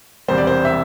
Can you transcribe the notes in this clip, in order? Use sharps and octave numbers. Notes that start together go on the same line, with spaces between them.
E1 E2 C3 G3 C5
D5
C5
E5